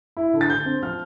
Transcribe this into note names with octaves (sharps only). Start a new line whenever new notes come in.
E4
D3
A6
D3 G6
C4
F3 F6